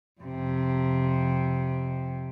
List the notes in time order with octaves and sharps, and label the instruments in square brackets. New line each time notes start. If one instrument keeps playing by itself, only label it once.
[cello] F2 C3